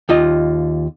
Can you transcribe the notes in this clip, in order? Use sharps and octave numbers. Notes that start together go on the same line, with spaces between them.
D#2 F4 D#5